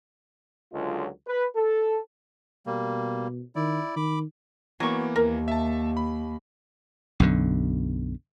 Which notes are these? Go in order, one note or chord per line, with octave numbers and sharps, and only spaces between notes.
C#2 D3 F#3 G#3 F4
B4
A4
B2 G3 A#3
D#3 E4 D5
D#3 B5 D6
E3 F#3 A#3 B3 C#6
D#2 A#4
E5 A5
B5
B1 F#2 D3